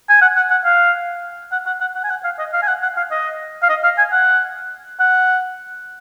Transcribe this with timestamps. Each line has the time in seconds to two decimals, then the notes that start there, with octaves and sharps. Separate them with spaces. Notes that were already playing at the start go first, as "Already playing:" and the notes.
0.09 G#5
0.21 F#5
0.36 F#5
0.50 F#5
0.65 F5
1.52 F#5
1.66 F#5
1.81 F#5
1.95 F#5
2.04 G#5
2.10 F#5
2.24 F5
2.39 D#5
2.53 F5
2.62 G#5
2.68 F#5
2.82 F#5
2.97 F5
3.11 D#5
3.63 F5
3.69 D#5
3.84 F5
3.98 G#5
4.12 F#5
5.00 F#5